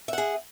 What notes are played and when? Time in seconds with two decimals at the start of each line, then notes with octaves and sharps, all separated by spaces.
0.08 E5
0.13 F#5
0.18 G#4